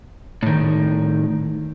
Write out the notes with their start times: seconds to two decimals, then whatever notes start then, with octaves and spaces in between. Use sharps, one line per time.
0.43 A2 D#3